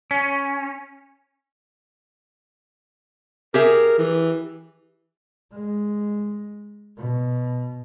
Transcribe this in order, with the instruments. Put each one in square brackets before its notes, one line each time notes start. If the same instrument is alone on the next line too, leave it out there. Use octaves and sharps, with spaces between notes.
[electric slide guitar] C#4
[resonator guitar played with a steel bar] G4 G#4 E5 [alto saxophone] A#4
[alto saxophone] E3
[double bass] G#3
B2